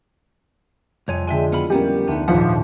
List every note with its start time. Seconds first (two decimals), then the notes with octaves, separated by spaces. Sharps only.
1.08 C2 F2 C#5 G#5
1.27 D3 G#3 E5 G5 G#5
1.52 B3 E4 F4 B5
1.70 G3 A#3 B3 C#4 G4
2.08 D2 B3 D#4
2.28 G#1 D#2 A#2 F3 B4 F#5